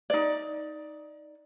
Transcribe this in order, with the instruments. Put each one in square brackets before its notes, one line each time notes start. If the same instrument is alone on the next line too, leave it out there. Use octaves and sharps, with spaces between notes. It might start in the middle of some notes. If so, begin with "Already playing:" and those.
[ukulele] D#4 D5